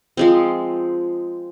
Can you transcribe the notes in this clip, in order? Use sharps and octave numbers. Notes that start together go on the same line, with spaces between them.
F3 G#3 C4